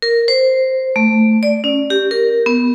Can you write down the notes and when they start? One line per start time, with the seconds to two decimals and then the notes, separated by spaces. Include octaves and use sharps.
0.02 A#4
0.28 C5
0.96 A3
1.43 D5
1.64 C#4
1.90 G4
2.11 A#4
2.46 B3